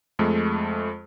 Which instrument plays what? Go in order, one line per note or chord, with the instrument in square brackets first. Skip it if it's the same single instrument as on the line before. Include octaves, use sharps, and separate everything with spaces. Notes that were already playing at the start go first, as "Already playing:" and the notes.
[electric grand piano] F2 G#3 A3